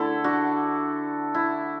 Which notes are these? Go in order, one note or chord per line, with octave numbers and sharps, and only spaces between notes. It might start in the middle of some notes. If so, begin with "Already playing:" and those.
Already playing: D3 A3 E4 A4
D4 F#4
E4